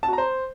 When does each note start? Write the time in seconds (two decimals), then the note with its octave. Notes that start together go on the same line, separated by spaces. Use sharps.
0.03 A5
0.08 F#4
0.13 A#5
0.18 C5